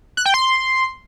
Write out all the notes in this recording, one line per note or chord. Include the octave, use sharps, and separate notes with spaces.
F#6
G5
C6